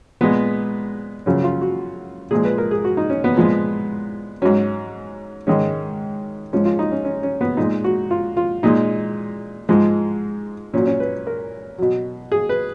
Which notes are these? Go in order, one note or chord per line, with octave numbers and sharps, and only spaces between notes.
A#2 G#3 B3
F#2 C#3 F3 C#4
F4
F#4
A#2 F3 G#3 G#4
B4
A#4
G#4
F#4
D#4
C#4
B3
A#2 F3 G#3
G#2 F#3 C#4
G#2 D#3 G#3 C#4
G#2 F3 G#3 C#4
F4
D#4
C#4
C#4
C#4
B3
A#2 G#3 D#4
F#4
F4
F4
A#2 G#3 D#4
G#2 F3 G#3
A#2 F#3 C#4
C#4
B4
A#4
B2 F#3
G#4
B4